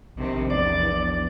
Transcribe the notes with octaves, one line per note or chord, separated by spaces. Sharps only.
A#1 C3 D#3
E2 D5 A6